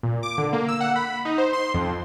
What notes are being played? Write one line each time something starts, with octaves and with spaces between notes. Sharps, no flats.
A#2
D6
D3
A#3
E6
F#5
B5
D#4
C5
C6
F2